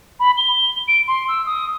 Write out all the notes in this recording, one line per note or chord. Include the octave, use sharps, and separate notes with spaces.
B5
G7
D7
C6
E6
D#6